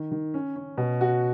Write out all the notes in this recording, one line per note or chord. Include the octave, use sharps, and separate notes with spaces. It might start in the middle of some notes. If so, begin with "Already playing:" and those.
Already playing: D#3
D#3
C#4
C#4
B2
F#4